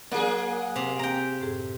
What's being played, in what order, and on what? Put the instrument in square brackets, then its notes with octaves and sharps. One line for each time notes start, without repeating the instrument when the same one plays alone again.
[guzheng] F#3 [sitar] A#3 G#4 [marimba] A#4 D5
[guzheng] C3
[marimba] C4 [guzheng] G5 A#5
[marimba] F#2 A2 G#4